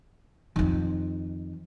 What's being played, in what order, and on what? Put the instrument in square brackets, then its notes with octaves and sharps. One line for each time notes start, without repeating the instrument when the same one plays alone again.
[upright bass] F2 D#3